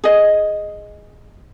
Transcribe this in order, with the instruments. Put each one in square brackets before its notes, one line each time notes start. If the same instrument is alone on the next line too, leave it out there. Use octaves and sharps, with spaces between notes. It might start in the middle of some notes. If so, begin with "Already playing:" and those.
[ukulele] G#4 D#5